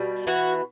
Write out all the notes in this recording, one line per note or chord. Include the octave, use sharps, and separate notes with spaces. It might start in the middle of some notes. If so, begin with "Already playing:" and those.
Already playing: B2 G3
E3 F#4